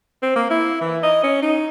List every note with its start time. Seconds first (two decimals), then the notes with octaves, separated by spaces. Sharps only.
0.22 C4
0.36 A#3
0.50 E4
0.81 E3
1.03 D#5
1.24 C#4
1.42 D#4